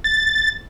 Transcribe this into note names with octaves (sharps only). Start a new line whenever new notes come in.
A6